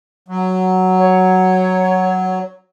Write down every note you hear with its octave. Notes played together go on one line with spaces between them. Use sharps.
F#3
C#5